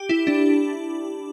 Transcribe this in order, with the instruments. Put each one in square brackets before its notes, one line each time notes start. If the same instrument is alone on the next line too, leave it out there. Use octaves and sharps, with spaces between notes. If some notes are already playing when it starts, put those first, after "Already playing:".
Already playing: [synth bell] G4
E4
D4